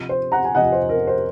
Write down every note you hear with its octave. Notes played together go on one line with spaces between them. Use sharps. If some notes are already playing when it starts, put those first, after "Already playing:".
Already playing: C3 F3
C5
F#5 A#5
G#5
C3 F3 D#5 F#5
C5
A#4
C5